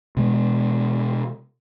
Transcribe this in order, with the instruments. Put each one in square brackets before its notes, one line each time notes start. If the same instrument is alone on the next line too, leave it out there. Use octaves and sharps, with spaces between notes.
[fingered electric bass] B2 G#3